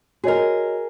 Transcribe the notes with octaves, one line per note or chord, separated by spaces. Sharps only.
F#4 G#4 A#4 C#5 D#5